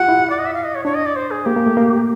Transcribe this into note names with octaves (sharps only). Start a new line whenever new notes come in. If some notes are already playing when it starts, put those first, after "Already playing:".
Already playing: F4 G4 F#5
E4
D5
D#5
E5
F5
D#5
C#5
D4 C#5
D#5
D5
C5
G#4
A#3 G4
A#3
A3
A#3